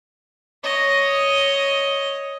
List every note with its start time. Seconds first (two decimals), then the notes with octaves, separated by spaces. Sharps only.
0.64 C#5 D#5